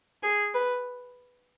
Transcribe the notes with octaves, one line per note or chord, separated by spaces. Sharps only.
G#4
B4